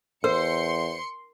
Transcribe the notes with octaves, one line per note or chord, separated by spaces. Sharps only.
E2 A#4 C5 C6 C#7